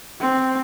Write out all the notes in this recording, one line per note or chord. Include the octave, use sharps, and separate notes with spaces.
C4